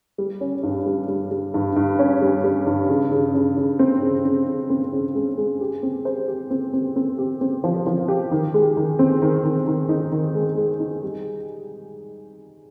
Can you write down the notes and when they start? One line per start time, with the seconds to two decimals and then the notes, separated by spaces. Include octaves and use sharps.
0.18 G3
0.41 C#4
0.63 G2
0.86 G3
1.08 G3
1.31 G3
1.54 G2
1.76 G2
1.99 C#4
2.21 G3
2.44 G3
2.67 G2
2.89 C#3
3.11 C#3
3.34 C#3
3.57 C#3
3.79 C4
4.02 C#3
4.25 C#3
4.47 C#3
4.70 C4
4.92 C#3
5.15 G#3
5.38 G#3
5.61 G4
5.83 C4
6.05 C5
6.28 G4
6.50 C4
6.73 C4
6.96 C4
7.18 G4
7.41 C4
7.64 F3
7.86 F3
8.08 G4
8.31 D#3
8.54 G#3
8.77 D#3
8.99 C4
9.22 D#3
9.45 D#3
9.67 D#3
9.89 D#4
10.12 D#3
10.35 G#3
10.57 G#3
10.80 D#4
11.03 G3